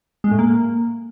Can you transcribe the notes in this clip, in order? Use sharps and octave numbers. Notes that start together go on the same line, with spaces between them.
G#3
A2
A#3